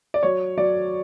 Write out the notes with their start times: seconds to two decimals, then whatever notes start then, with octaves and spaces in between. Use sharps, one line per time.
0.14 D5
0.23 F#3 C#5
0.57 F#3 D5